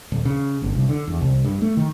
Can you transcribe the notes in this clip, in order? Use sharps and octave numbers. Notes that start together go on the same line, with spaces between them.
D#1
C#3
G1
C2
D3
E2
C2
G2
A3
D#3